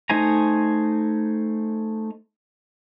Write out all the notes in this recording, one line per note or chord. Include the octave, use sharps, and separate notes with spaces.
A3 D#4 C5 G#5 A#5